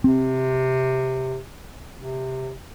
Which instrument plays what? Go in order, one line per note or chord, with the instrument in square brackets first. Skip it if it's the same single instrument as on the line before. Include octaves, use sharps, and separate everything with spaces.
[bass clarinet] C3 [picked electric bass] C4
[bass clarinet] C3